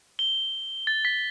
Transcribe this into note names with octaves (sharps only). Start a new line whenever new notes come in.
G7
A6
B6